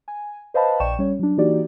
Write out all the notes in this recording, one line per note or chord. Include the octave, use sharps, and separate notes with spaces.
G#5
B4 C5 D#5 F5 A5 B5
A#1 D5 G5 C#6 E7
G3 C#4 C#5
F#3 D4
E3 A#3 D#4 F#4 G4 D5